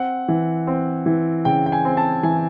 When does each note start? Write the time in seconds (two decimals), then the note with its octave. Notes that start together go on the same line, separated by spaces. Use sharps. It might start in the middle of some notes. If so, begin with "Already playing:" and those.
Already playing: C4 F#5
0.28 E3
0.67 C4
1.06 E3
1.45 C#3 G5
1.66 G5
1.72 G#5
1.85 C4
1.97 A5
2.23 E3 G#5